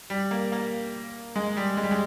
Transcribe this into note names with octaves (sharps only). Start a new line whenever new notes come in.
G3
A#3
A#3
G#3
G3
G#3
G3
G#3